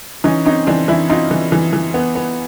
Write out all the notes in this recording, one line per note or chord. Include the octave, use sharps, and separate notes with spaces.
E3 C#4 D#4
C4 C#4 D#4
E3 C4 D4
E3 D4 E4
C4 D#4 F4
E3
E3
E3
B3
B3